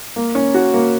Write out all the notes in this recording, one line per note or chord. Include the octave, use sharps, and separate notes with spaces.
A#3
C#4
F#4
A#3